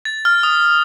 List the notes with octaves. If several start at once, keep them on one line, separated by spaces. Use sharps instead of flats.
A6
F6
D#6